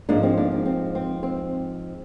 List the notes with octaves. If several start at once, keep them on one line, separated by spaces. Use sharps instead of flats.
G#2 F3 G#3 A#3 D4
C4
A#3 D4
C4
C4
C4
C4